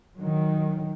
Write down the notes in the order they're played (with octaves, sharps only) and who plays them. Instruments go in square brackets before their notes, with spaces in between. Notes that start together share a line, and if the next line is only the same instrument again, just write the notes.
[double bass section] D#3 F#3